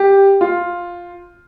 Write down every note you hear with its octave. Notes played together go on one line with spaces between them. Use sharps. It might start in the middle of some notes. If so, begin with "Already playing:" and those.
Already playing: G4
F4